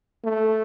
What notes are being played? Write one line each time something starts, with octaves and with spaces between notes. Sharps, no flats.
A3